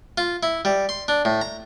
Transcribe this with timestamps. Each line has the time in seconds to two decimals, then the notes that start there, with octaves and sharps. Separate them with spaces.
0.18 F4
0.43 E4
0.65 G3
0.89 C6
1.08 D4
1.25 A2
1.41 A#5